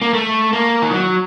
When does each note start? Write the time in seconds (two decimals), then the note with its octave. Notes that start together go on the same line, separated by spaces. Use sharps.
0.02 A#3
0.14 A3
0.53 A#3
0.82 D#3
0.91 F#3